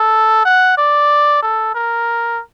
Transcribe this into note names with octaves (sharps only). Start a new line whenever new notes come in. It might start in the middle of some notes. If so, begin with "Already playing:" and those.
Already playing: A4
F#5
D5
A4
A#4